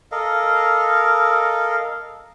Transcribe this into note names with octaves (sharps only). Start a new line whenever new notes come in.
A4 A#4 D#5 F5